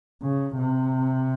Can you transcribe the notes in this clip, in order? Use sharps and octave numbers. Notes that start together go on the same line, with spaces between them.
C#3
C3